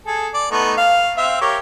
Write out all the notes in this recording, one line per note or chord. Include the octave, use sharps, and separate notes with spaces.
G#4 A4
D5
A3 B3 D#4
F5
C4 E5 F5
G4 A#4 C#5